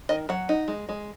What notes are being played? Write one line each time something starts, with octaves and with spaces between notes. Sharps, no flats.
D#3 D#5
F#3 F#5
D#4
G#3
G#3